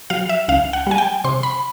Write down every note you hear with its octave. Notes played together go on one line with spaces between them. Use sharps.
F#3 F5
E5
C#2 F5
F#5
G3 G#5
G5
C3 C6
B5